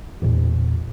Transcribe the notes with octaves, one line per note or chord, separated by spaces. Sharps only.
A1 E2 A#2